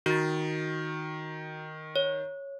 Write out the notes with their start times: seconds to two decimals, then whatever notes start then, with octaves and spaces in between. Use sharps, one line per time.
0.06 D#3 F#4 A6
1.96 C#5